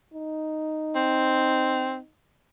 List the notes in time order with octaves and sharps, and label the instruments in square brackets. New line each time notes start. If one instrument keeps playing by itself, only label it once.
[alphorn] D#4
[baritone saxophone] C4